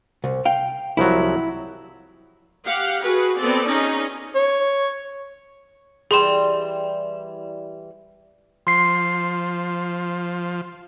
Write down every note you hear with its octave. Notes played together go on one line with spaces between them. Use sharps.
C2
F5 G5
C2 F3 F#3 E4
G4 F5 F#5
F#4 G#4 B4
B3 C4 A4 D5
C#4 D#4 G#4
C#5
E3 G3 G#4 C6 E7
F3 C6 C7